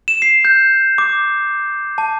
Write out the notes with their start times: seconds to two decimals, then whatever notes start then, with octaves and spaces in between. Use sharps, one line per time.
0.08 E7
0.22 C7
0.45 G6
0.98 D6
1.98 A5